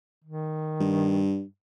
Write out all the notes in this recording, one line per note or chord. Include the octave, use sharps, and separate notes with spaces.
D#3
G2